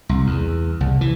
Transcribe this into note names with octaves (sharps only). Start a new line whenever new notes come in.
C2
E2
C2
E3